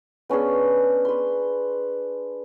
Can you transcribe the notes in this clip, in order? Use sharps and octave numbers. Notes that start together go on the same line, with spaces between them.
B3 C#4 D4 G#4
B4 C6